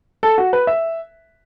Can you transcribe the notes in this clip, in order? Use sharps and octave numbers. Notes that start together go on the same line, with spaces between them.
A4
F#4
B4
E5